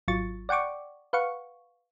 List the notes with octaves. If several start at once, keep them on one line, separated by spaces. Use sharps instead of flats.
G#1 F#3 F4 C#6 A6
D5 F#5 G5 C#6 D6
B4 F5 F#5 C#6